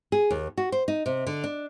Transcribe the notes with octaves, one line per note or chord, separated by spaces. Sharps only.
G#4
D#2
F#4
C5
D#4
C3
D3
D4